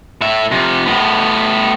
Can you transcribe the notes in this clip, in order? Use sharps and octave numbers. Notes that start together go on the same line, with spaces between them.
A2 E5
C3 F3
A2 B3